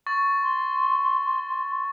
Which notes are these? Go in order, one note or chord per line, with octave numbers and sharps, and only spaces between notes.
C#6 A6
C6